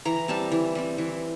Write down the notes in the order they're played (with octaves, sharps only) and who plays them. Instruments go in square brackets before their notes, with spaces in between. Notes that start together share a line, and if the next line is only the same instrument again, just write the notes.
[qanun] E3 A#5
G3 C4 A5
E3
G3 C4
E3